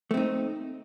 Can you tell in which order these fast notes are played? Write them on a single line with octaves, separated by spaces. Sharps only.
A3 C4 D#4